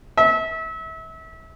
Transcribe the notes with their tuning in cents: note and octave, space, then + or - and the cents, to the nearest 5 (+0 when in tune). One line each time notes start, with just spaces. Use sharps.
E5 -30